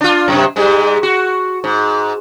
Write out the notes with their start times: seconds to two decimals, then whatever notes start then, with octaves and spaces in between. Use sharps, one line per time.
0.01 D4 F4
0.28 F#2 C3
0.56 G#2 G3 G#3
1.03 F#4
1.64 G#2